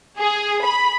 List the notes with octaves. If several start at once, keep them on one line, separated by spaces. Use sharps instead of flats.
G#4
B5